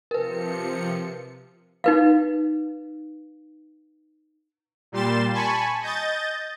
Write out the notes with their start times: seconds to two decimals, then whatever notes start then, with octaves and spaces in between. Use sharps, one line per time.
0.11 C3 F3 A#4 B4 C#7
1.84 D#4 B4 F5
4.92 A#2 G3 C6 A6 E7
5.34 G#5 A5 B5 C#6
5.81 D#5 G6 A6